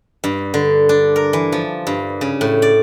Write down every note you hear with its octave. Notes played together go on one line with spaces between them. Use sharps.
G2
D3
D4
A#4
E3
F3
G2
C#3
A2
D5